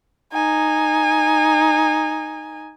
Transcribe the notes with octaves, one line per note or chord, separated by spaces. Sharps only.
D#4 G#5